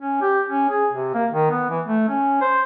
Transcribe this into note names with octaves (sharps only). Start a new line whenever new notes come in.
C#4
G4
C#4
G#4
C3
A#3
D#3
B3
E3
A3
C#4
C5